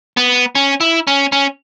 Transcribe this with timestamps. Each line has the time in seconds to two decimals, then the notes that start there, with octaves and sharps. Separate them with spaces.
0.17 B3
0.55 C#4
0.81 E4
1.07 C#4
1.32 C#4